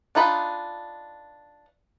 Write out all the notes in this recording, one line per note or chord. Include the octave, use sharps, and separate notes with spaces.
D4 D#4 F4 B4 D#5